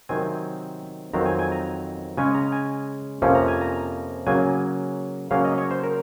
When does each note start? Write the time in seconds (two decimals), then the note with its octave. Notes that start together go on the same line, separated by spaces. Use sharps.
0.09 C3 D#3 F#3 C4 G#5
1.13 F2 D#3 F#3 C4 A#5
1.26 G#5
1.39 G#5
1.52 A#5
2.17 C#3 G#3 C#4 G#5
2.35 A#5
2.52 G#5
3.22 F2 C3 F3 A#3 C#4
3.35 A#5
3.48 G#5
3.61 A#5
4.27 C#3 F#3 A#3 G#5
5.31 C#3 F#3 A#3 C#4 F5
5.45 D#5
5.58 C#5
5.71 C5
5.83 A#4